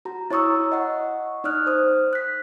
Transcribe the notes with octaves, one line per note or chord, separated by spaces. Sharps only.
F#4 A#5
E4 C#5 A#5 C#6 D#6 E6
D#5 F#5 C#6
D#4 D5 D#6 F6 F#6
C5 D#6
F#6 B6